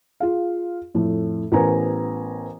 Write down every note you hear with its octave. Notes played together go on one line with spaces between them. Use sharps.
F4 G#4 F5
F2 A2 A3
A1 B3 A#4 C5 G#5 A#5